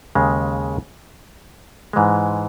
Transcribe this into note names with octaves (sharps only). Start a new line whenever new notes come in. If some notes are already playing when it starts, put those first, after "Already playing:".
D#2 C#3 G#3
G#2 E3 G#3